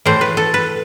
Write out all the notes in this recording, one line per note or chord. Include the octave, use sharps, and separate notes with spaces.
A2 E3 A3 C5
B4
A4
B4